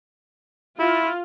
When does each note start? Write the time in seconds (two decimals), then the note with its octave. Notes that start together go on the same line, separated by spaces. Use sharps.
0.79 E4 F4